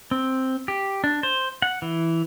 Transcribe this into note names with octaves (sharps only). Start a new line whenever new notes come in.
C4
G4
D4
C5
F#5
E3